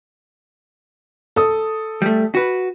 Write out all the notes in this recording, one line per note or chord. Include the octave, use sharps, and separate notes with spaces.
A4 D#6
G3 A3
F#4 B4